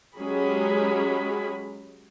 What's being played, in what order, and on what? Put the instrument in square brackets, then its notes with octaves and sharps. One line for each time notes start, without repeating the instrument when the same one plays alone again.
[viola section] F#3 G#3 C#4 G4 G#4 B5